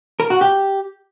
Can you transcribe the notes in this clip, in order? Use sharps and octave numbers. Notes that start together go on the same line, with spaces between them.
A#4
F#4
G4